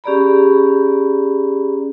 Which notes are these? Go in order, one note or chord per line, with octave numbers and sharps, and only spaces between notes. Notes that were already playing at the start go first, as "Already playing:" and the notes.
C#4 G4 G#4 D5 A#5 B5